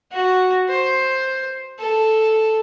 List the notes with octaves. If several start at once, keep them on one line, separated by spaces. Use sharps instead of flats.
F#4
C5
A4